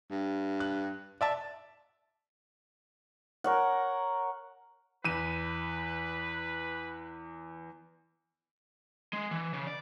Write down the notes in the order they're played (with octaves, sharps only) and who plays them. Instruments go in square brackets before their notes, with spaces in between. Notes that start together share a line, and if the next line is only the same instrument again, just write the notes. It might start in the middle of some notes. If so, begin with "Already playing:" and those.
[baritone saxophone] G2
[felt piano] F#6
D5 E5 A5
[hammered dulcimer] A#4 C#5 F#5
[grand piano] E2 D#7 [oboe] B4
[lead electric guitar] G#3
E3
C#3
D5